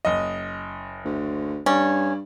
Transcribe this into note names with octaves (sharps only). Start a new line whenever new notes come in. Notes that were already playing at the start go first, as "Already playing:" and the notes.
F#1 D#5
D2
G2 C#4 D5